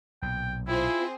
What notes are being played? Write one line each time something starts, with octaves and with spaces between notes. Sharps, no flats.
B1 A#2 G5
C4 E4 F4 G#4 C5